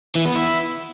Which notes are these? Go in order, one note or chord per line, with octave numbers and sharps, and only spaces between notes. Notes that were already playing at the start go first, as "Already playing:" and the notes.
E3
B3
E4